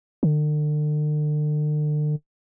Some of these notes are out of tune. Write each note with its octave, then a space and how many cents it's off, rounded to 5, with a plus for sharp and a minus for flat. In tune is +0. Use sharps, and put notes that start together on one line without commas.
D3 +40